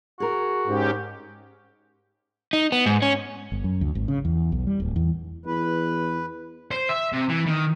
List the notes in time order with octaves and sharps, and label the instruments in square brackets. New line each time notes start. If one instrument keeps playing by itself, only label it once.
[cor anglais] F#4 [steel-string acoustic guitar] G#4 A#4
[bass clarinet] G#2 [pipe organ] G#3 C#4 G4
[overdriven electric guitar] D#4
B3
G#2
C#4
[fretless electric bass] G1
F#2
D2
G#1
C#3
E2
B1
G3
D1
E2
[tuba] E2 [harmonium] B4
[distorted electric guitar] C5
E5
C3
E3
D#3